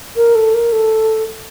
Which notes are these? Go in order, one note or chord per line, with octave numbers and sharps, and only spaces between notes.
A#4
A4
A#4
A4